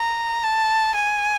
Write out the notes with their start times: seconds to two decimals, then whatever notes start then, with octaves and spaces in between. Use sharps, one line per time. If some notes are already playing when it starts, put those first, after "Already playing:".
Already playing: A#5
0.44 A5
0.95 G#5